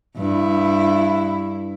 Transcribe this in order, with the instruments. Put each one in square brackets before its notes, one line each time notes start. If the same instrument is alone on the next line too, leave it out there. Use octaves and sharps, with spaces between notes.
[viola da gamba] G2 E4